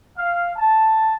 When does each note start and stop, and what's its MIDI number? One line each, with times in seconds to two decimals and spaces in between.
0.17 0.52 77
0.56 1.14 81